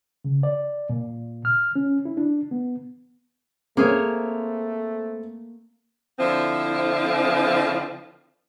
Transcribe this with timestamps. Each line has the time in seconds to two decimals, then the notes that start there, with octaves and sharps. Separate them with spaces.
0.25 C#3
0.43 D5
0.89 A#2
1.45 F6
1.76 C#4
2.05 E4
2.17 D4
2.51 B3
3.77 A3 A#3 C4 G#4 C#5
6.19 D3 F3 C4 E4